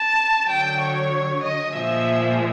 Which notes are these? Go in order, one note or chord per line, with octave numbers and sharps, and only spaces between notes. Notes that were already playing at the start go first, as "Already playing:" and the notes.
Already playing: A5
D3 F#3 G5
C#5
D#5
A#2 F3 G#3 E5